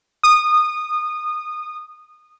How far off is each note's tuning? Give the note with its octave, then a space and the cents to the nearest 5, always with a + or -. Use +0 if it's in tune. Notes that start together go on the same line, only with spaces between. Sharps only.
D#6 -20